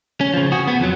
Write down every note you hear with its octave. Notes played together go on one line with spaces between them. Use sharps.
C#4
C#3 F3
F#4 G#4
B3
F2 F#3